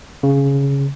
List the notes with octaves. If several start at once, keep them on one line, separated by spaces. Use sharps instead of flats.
C#3